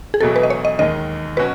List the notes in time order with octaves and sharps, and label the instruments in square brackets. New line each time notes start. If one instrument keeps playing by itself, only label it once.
[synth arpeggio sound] G#4
[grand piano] E1 E2 B2 F#3 A3 [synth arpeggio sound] A4
[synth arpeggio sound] B4
D#5
C#5
D#5
[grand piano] D#2 D#3 G#3 [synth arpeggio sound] D#5
[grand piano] B2 F#3 C#4 F#4 [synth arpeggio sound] B4